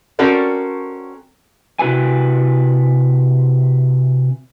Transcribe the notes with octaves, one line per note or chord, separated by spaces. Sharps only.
C4 C#4 F#4 A4 A#4 D5
C3 E4 F#4 B4 G#5